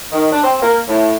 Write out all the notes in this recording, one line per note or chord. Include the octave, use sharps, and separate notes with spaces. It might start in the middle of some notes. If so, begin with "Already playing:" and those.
D#3
D4
C4
A#3
A2